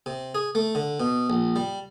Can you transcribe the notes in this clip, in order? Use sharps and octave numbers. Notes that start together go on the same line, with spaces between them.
C3
G#4
A3
D3
B2
A#1
G3